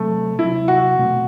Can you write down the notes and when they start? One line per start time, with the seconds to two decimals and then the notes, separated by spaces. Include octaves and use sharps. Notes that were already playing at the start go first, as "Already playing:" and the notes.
Already playing: C3 F#3 A3 C4
0.38 C3 F#3 C4 E4
0.68 F#4
0.99 B2 A3 C4